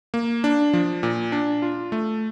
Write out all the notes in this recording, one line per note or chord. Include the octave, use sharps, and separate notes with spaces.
A#3
D4
F3
A#2
D4
F4
A3